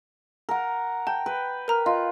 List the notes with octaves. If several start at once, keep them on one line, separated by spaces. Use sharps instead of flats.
A#4 F#5
G5 A5
B4
A#4 A#5 F6
F4 D#5